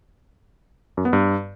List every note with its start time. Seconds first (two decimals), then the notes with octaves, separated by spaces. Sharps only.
0.97 F#2
1.05 B3
1.13 G2